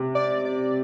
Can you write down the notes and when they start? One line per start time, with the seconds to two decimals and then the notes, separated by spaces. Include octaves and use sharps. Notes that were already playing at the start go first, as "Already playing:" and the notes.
Already playing: C3
0.15 D5
0.45 D5